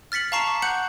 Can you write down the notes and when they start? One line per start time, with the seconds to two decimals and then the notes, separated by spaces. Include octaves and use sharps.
0.12 F6 A6 B6 C#7 F#7
0.32 F5 A5 A#5 C#6 C7 E7
0.48 D6
0.62 F#5 F#6 G6 C#7 F#7